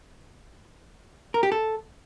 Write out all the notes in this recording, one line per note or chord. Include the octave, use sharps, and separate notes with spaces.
A#4
G4
A4